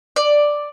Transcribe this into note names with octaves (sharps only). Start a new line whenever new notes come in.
D5